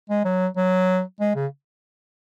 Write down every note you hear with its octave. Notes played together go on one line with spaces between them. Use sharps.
G#3
F#3
F#3
G#3
C#3